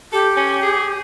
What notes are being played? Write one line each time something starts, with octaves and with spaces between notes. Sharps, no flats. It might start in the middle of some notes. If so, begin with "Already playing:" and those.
G4 A4
C#4
G#4